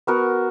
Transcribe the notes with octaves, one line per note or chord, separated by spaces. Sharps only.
B3 F#4 A#4